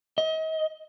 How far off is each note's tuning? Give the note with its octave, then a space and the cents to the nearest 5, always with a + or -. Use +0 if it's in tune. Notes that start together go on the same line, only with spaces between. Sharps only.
D#5 +35